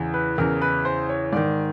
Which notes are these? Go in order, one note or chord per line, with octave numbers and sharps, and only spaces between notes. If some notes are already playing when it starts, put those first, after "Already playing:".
Already playing: E2 C#3 E3
B4
E2 C#3 E3 A#4
B4
C5
C#5
G#2 D#3 D5